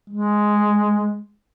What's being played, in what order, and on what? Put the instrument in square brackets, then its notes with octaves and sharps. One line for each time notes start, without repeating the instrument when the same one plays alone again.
[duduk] G#3